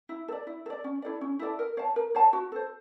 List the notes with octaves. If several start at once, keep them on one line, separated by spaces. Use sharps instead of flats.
E4
A4
D5
E4
A4
D5
C#4
E4 A4 D5
C#4
E4 A4 D5
A#4
C#5 F5 A5
A#4
C#5 F5 A5
F#4
A4 C5